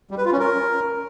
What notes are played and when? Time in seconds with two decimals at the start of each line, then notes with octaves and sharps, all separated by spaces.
0.11 G3
0.18 B4
0.25 F4
0.32 C#4
0.39 A#4